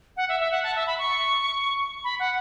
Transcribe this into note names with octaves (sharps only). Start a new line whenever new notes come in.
F#5
E5
E5
F#5
A5
E5
B5
C#6
B5
F#5